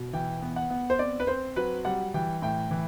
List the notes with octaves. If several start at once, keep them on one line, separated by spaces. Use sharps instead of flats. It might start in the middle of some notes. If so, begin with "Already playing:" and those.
Already playing: B2
E3 G5
B3
F#5
B3
C5
C4 D5
B4
C4 C5
F#3 B4
G3 F#5
E3 G5
A2 G5
E3